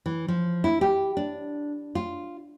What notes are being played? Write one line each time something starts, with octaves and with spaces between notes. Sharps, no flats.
E3
F3
E4
G4
D4
F4